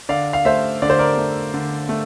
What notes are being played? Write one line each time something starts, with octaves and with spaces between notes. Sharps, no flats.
D3 D5 F5
F5
A3 C5 E5
D3 D5
C5
A#4 D5
A3
D3
A3